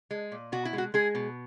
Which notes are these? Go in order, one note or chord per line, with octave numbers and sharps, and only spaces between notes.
G#3
A#2
B2 F#4
E4
G#3
F#4
G#3 G#4
B2